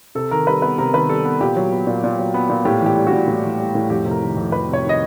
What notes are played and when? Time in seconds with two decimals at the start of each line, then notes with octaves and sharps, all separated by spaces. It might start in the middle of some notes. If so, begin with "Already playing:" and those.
0.15 C3 A4
0.31 D#3 A#4
0.47 G3 B4
0.62 B3 B4
0.78 C3 A#4
0.93 D#3 B4
1.09 G3 A4
1.25 B3
1.41 A#2 G4
1.57 F#3
1.72 B3
1.87 A#2
2.04 A#2
2.19 F#3
2.34 B3
2.49 A#2
2.65 A2 G4
2.81 E3
2.86 G4
2.97 G3
3.07 F#4
3.12 A2
3.28 A2
3.44 E3
3.59 G3
3.75 A2
3.90 F2 G4
4.05 C3
4.11 A#4
4.21 D#3
4.37 F2
4.52 F2 B4
4.69 C3 C#5
4.84 D#3
4.89 D#5